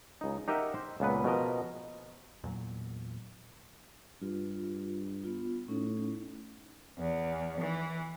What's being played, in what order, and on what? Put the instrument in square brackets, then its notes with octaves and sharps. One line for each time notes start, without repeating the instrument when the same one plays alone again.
[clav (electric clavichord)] C#2 D#4
D#4 G4 A#4 D#5 E5 F#5
C5
C#2 A#2 B3 B4
B2 F3 A#4 D#5
[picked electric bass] E2 A#2 F#3
[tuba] G2 [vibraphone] F4
[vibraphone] B3 F4
[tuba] A2 [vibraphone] C#4 D#4 E4
[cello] E2
E3